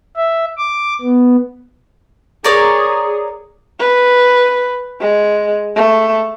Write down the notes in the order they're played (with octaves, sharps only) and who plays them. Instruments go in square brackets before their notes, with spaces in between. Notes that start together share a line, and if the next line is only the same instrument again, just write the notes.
[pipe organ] E5
D6
B3
[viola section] G#4 [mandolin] A#4 C#5 D5
[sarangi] B4
G#3
A3